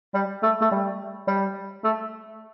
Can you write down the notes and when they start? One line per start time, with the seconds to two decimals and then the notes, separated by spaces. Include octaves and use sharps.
0.14 G3
0.43 A3
0.61 A3
0.71 G3
1.27 G3
1.84 A3